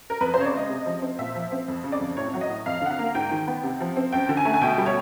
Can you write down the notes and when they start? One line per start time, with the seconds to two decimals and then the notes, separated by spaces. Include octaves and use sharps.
0.10 A#4
0.21 F2 B4
0.34 C5
0.37 C#3 C#5
0.46 D5
0.53 G#3 D#5
0.70 C3
0.86 F3
1.02 C4
1.19 A#2 E5
1.35 F3
1.52 C4
1.68 F2
1.84 C#3
1.92 D5
2.01 F2
2.17 A2 C#5
2.34 F#3
2.41 D#5
2.50 A2
2.66 F2 F5
2.81 D3 F#5
2.91 F5
2.99 A#3
3.15 G#2 G5
3.31 D#3
3.48 B3
3.63 C3
3.81 F3
3.97 C4
4.12 F#2 G5
4.29 D3
4.37 G#5
4.45 A3
4.54 G#5
4.61 B2 G5
4.78 G3
4.86 C#5